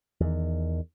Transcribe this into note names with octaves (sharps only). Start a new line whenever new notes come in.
E2 D#3